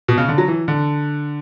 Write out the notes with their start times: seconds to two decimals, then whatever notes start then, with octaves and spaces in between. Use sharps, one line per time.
0.08 B2
0.18 C#3
0.28 D3
0.38 F#3
0.48 E3
0.68 D3